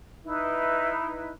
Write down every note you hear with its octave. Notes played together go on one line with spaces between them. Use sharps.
D#4 E4 B4